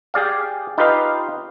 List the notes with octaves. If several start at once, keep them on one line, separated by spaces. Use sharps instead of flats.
G4 G#4 D5 F5
D#4 F4 G4 B4 D#5 F5